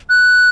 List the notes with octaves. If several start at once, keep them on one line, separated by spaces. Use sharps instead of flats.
F#6